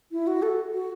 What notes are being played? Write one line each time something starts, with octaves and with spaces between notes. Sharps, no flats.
E4
F#4
A4
F#4